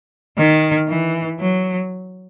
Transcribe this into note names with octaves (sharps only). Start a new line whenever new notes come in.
D#3
E3
F#3